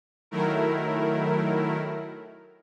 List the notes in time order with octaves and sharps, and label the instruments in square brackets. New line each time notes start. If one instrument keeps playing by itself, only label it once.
[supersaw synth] D#3 F#3 A3 E4 A#4